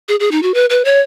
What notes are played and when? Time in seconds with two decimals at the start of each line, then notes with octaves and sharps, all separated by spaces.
0.08 G#4
0.20 G#4
0.31 D#4
0.43 F#4
0.54 B4
0.70 B4
0.85 C#5